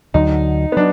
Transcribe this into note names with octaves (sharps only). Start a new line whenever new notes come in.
D2 D3 F#3 D#4
B3
F#3 D4